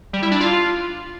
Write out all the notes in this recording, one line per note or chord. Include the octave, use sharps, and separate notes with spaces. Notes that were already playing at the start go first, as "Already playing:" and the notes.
G3
E4
D4
F4